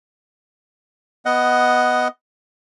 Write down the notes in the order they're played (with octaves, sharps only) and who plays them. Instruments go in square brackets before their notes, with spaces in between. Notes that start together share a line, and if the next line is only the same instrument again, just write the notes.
[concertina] B3 D#5 F#5